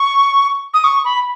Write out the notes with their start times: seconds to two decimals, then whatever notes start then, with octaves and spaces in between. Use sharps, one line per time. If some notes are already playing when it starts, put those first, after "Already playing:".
Already playing: C#6
0.74 D#6
0.84 C#6
1.05 B5